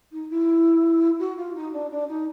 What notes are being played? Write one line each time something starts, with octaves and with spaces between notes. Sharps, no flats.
D#4
E4
F#4
F4
D#4
D4
D4
D#4